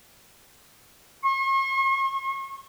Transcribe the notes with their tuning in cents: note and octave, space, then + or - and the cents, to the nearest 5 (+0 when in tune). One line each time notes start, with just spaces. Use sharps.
C#6 -45